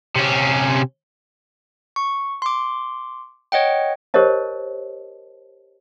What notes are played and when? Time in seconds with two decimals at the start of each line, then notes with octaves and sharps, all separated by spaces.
0.16 C3 C#4
1.96 C#6
2.42 C6 D6
3.52 C#5 D#5 F#5 G5
4.14 G4 A#4 C5 C#5 D#5 A5